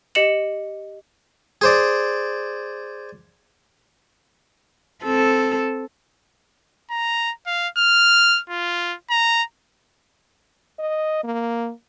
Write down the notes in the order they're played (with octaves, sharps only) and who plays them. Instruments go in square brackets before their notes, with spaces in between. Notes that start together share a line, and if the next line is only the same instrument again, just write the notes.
[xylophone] G4 D#5 C#7 E7 F#7
[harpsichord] G#4 C5 D5
[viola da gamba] C4 A4
[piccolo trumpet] A#5
F5
F6
F4
A#5
[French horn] D#5
A#3